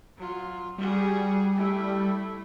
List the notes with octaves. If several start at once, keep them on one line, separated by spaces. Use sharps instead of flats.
F#3 F4
G3 F#4 G#4
A3 E4